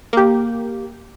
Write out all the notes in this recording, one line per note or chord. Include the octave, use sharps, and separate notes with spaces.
A#3 G4